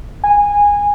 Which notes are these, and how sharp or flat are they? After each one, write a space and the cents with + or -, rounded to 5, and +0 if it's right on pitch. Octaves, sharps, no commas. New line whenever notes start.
G#5 -20